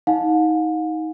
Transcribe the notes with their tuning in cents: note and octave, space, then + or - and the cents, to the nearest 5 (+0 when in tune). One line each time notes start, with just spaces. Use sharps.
D#4 +25 F5 +45 G#5 +0